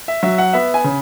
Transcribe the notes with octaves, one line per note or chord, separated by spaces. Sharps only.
E5
F#3 E5
F#5
B3 E5
G#5
C#3